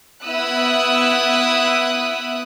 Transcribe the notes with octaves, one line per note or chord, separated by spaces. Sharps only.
B3 E4 D#6 E6 F#6